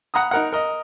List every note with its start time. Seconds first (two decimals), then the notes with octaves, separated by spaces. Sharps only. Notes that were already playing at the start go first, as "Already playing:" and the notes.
0.14 F#5 A#5 B5 D#6
0.31 D#4 A#4 F#5
0.52 A#4 D#5